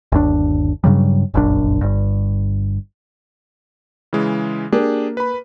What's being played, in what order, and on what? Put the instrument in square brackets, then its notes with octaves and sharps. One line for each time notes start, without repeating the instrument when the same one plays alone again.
[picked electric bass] G1 D#2 D4
G2 C#3 F#3 G3
F1 A#1 F#2 D4
G1 G2
[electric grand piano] C#3 E3 G#3
[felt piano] A#3 [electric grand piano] D4 G4 G#4
[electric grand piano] B4 B5